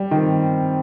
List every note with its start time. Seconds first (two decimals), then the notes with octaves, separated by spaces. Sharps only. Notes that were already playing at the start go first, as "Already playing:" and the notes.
Already playing: G3
0.11 D#3 C4